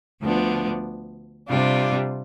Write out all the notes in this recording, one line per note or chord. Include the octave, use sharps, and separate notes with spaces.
D2 D3 F3 B3 D4
C3 G3 D4 F4